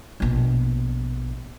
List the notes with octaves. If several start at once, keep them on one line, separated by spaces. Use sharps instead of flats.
A#1 B2